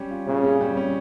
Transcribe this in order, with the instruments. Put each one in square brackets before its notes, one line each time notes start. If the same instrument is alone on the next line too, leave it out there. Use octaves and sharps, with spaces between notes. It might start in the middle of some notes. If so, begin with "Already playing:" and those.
Already playing: [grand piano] G3 C#4
F4
[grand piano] A#2 [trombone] C#3
[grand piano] C#4
G3
C#4